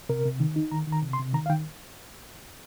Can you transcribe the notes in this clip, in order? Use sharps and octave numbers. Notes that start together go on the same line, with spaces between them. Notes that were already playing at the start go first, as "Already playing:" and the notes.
C3 A#4
C3
D#3
D#4
D#3 A#5
D#3
A#5
C3
C6
C3
D#3 A#5
F5
D#3 G5